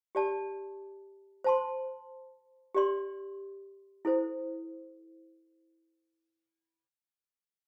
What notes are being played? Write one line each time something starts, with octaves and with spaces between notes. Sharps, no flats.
G4 D5 A5
C5 A5 C6
G4 D5 C6
E4 A4 C5